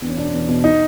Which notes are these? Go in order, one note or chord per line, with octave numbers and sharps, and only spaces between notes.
E2 D4
C#4
B2 D4
E2
B2
D#4